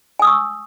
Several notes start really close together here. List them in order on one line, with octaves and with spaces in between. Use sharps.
G#5 D#6 E6 C#6